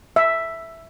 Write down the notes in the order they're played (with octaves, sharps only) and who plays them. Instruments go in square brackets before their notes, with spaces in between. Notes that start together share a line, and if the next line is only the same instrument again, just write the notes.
[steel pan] E5